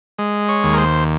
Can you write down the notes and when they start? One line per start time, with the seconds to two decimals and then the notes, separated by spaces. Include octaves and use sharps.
0.18 G#3
0.49 C#5
0.64 D#2
0.73 A#4
0.77 C5